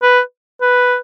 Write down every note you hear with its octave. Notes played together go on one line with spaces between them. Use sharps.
B4
B4